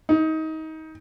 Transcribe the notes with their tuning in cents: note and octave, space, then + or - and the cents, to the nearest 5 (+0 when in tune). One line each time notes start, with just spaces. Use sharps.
D#4 +25